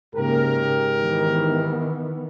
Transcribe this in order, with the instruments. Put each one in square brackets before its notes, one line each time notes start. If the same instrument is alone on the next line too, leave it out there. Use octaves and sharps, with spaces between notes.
[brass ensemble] G#2 G4 A#4 [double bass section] C#3 A#3
[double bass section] D#3 E3 B3